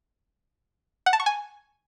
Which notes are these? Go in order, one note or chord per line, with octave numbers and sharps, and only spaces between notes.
F#5
A5
C#6
G#5